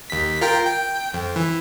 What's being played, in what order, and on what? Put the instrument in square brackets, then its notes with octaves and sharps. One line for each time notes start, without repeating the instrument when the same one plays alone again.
[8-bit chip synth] D#2 B6
F4 A#4 G5
G5
F2
E3